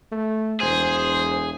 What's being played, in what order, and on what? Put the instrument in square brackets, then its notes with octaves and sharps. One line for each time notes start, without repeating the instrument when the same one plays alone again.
[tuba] A3
[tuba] E1 [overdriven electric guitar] G#4 [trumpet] C5